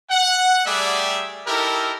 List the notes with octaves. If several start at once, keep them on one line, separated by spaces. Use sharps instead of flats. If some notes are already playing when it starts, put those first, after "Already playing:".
F#5
G3 A3 G4 G#4 D5 E5
D#4 E4 G4 A4 A#4